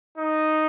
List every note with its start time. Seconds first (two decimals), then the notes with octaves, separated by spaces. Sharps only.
0.18 D#4